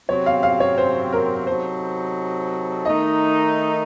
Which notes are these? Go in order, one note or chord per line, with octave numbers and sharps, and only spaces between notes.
C3 F#3 C4 C#5
F5
F5
C#5
C5
A#4
C3 F#3 C4 D#4 A4 C5
D#3 A3 D#4 A#4 D#5